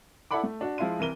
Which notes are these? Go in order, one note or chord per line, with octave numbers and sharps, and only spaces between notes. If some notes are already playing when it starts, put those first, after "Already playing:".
E4 A4 D5 F#5 B5 D6
A3
D4 F#4
F3 G#3 E4 F5 C6 D#7
C2 E3 A#4 D#7 G7